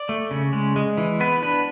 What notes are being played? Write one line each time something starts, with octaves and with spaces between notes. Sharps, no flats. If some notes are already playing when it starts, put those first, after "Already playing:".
Already playing: D5
A3
C#3
G#3
G#3
E3
B3 B4
D4 B4